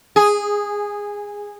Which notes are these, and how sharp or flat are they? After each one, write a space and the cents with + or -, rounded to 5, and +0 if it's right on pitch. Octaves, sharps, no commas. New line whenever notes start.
G#4 -15